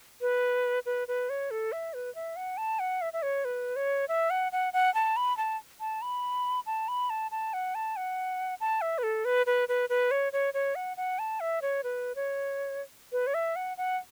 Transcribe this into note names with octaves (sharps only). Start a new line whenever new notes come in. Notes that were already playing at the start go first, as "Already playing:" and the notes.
B4
B4
B4
C#5
A4
E5
B4
E5
F#5
A5
F#5
E5
E5
C#5
B4
C#5
E5
F#5
F#5
F#5
A5
B5
A5
A5
B5
A5
B5
A5
A5
F#5
A5
F#5
A5
E5
B4
A4
B4
B4
B4
B4
C#5
C#5
C#5
F#5
F#5
A5
E5
C#5
B4
C#5
B4
C#5
E5
F#5
F#5